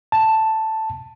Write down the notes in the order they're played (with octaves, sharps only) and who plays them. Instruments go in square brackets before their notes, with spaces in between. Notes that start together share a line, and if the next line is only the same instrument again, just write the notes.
[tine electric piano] A5